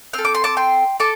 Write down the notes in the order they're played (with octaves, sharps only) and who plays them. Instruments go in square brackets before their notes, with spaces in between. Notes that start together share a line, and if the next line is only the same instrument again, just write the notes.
[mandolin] C4 A4 F6
D6
C6
A5 D6
G5 C6
A4 A5 D6